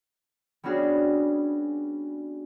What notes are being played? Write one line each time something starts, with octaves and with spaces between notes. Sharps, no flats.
G3 B3 C#4 D4 F#4 G#4